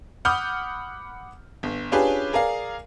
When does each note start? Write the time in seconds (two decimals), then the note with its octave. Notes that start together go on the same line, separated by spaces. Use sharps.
0.25 F#5 B5 D6 D#6 F6 G6
1.63 G1
1.92 C#4 D4 F4 G4 G#4 B4
2.33 G#4 A#4 D5 F5